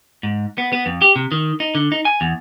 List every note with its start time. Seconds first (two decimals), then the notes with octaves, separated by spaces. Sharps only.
0.23 G#2
0.58 B3
0.73 B3
0.86 F2
1.02 G4
1.16 C3
1.32 D#3
1.60 D#4
1.75 D3
1.92 D#4
2.05 G#5
2.21 E2